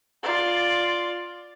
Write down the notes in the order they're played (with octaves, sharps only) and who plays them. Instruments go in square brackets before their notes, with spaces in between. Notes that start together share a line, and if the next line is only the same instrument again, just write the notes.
[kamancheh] F4 D5